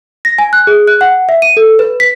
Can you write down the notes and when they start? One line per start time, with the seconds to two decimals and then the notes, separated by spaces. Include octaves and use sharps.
0.25 A#6
0.38 G#5
0.53 F#6
0.67 G#4
0.87 F#6
1.01 F#5
1.29 E5
1.42 D#7
1.57 A4
1.79 B4
2.00 B6